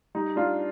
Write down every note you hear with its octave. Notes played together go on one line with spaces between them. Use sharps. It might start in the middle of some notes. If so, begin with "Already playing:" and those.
G3 D#4
D4 F4